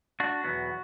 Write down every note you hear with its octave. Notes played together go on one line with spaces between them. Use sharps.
D4 F#4
E2 B2 F#3 B3